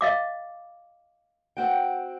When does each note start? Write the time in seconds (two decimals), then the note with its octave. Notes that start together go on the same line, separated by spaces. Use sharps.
0.01 D#5 F5 D6
1.57 C4 F#4 G5